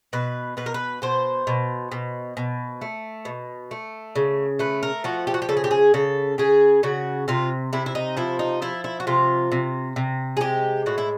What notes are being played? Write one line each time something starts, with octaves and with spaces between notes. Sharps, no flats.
B2 B4
B2 B4
A#4
B4
B2 C5
B2
B2
B2
A3
B2
A3
C#3
A3 B4
A#4
F3 F#4
G4
F#4
G4
C#3 A4
G#4
G4
G#4
C#3 A4
C#3 G#4
C#3 F#4
C3 F4
C3 E4
E4
D#4
F3 E4
D#4
F3 E4
E4
F#4
C3 F4
C3
C3
G#4
G#3 G4
A2 F#4
E4